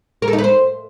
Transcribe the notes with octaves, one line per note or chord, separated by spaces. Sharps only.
A#4
A4
D#4
B4
C5